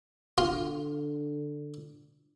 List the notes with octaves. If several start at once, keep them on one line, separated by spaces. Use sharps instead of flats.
D3 F4